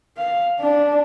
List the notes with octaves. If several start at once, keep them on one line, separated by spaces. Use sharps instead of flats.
F5
D4